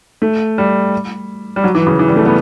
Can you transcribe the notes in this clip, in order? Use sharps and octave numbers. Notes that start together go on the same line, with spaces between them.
A3
G3
G3
F#3
E3
C#3
E3
G3
A3
B3